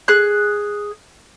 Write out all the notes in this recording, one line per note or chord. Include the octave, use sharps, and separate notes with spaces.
G#4 F#6